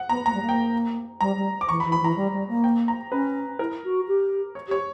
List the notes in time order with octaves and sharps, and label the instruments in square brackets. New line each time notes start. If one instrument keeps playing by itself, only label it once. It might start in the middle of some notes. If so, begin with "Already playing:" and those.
Already playing: [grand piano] F#5
[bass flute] B3 [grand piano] A#5
[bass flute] A#3 [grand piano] A#5
[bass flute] G3
A#3
[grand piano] G5
[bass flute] G3 [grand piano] A#5
[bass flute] G3
[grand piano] D6
[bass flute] E3 [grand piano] C#6
[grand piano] B5
[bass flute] E3
[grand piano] B5
[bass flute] E3 [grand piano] A#5
[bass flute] G3
G3
A#3
[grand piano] G5
A#5
[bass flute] C#4 [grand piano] B4
[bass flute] E4 [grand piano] A#4
[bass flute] F#4
G4
[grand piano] C#5
[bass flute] G4
[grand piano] C#5